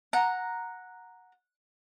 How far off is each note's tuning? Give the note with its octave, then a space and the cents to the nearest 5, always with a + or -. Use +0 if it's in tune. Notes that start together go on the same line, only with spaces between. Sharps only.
F#5 -10 A#5 +0